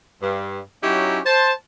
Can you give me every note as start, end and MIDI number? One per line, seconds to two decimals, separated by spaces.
0.22 0.60 43
0.83 1.20 54
0.83 1.20 61
0.83 1.20 63
0.83 1.20 64
0.83 1.20 66
0.83 1.20 67
1.25 1.52 72
1.25 1.52 81